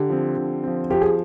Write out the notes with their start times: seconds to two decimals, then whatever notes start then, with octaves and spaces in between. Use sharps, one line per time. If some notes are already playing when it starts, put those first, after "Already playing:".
Already playing: D3 G4
0.10 F3 C4
0.37 D3
0.64 F3 C4
0.90 F3 G4
1.01 G#4